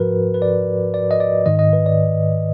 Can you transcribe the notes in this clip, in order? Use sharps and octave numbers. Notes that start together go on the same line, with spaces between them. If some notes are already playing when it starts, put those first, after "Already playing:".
Already playing: G#2 F3 F#4 A#4 B4
B4
D5
D5
D#5
D5
G#2 D#3 D#5
D#5
B4
D5